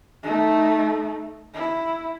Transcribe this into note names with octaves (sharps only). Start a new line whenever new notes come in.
A3 D#4
E4